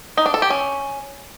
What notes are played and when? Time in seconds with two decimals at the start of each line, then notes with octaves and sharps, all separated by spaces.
0.17 D#4
0.26 D4
0.34 A4
0.42 G4
0.50 C#4